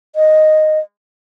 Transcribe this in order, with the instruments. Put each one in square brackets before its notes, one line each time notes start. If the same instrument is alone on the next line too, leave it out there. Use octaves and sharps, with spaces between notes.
[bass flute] D#5